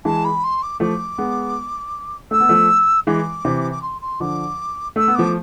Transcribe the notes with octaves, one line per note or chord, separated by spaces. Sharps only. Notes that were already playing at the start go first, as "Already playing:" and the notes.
E3 G#3 A5
B5
C6
D6
F3 A3 D6
G#3 B3
A3 E6
B3
F3 A3
E3 G#3 D6
C3 E3
D6
C6
C6
D3 F3 D6
A3 E6
B3
F3 A3 D6